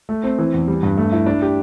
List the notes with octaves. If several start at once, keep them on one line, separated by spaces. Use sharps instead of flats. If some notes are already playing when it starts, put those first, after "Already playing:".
A3
C4
E3
E2
G3
G2
A3
E4
D4
G4